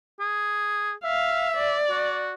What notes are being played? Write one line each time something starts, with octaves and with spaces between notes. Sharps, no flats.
G#4
E5 F5
D5
F#4